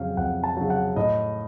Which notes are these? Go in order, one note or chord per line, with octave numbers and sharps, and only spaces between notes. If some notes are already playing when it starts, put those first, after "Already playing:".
Already playing: F2 C#3 F#3 F5
F2 F#5
A5
C#3 F#3
F#5
A2 D#5